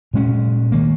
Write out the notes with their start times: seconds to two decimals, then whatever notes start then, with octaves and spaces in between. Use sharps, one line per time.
0.14 A#2 G#3 C#4
0.72 D#3 A#3